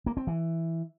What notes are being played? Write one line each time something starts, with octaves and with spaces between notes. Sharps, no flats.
A#3
C4
E3